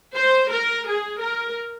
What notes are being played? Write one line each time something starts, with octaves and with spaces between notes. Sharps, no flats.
C5
A#4
G#4
A#4